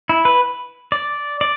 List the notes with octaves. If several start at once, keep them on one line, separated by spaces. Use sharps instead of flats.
E4
B4
D5
D5